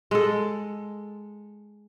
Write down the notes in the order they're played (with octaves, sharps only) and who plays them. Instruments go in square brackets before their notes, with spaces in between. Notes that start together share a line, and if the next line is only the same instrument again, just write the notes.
[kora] G#3 A4